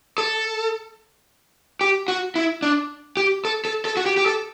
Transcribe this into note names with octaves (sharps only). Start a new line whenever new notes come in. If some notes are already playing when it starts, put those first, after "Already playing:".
A4
G4
F#4
E4
D4
G4
A4
A4
A4
F#4
G4
G4
A4